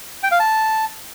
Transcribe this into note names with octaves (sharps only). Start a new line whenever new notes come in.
G5
F5
A5